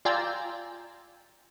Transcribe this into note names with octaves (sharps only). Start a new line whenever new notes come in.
F4 D5 G5 G#5 A#5 E6